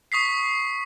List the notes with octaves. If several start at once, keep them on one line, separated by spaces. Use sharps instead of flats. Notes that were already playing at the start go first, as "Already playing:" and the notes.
C#6 D#6 B6 C7